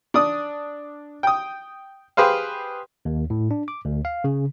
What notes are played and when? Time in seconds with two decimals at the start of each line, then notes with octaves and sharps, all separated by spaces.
0.14 D4 D5 D#6
1.23 G5 D#6
2.17 G4 G#4 B4 C5 F5
3.05 D#2
3.30 A2
3.51 D4
3.68 D6
3.85 D2
4.05 F5
4.24 C#3